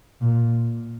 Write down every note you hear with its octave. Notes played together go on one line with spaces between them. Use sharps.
A#2